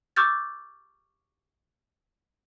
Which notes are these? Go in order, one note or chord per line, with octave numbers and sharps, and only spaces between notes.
C#6 D6 E6 F6 G6 A6